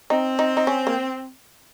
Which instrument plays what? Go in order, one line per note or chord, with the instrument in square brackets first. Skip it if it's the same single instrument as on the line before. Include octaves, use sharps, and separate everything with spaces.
[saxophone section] C4 [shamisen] D#4
[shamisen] D#4
D#4
C#4
A#3